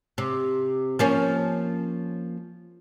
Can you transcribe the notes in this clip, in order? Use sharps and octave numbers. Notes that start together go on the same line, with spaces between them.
C3
F3 A#3 C#4